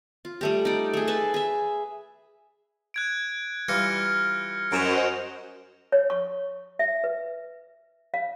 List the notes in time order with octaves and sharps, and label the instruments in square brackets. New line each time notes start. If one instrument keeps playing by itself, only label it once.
[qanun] F4
G3 A3 G4
D#4 D5
A3 G#4
G#4 B4 E5 A5
G#4 E5
[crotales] F#6 G#6 D7
[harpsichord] E3 G3 F4 [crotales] F6 A#6 C#7
[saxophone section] F#2 [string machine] F#4 C5 D#5 [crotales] D7 E7 F7
[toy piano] C#5
C#6
E5
B4
F5